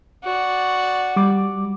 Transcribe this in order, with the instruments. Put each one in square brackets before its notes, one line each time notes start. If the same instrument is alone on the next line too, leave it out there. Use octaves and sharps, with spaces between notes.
[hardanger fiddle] F#4 D5
[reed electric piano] G3 D6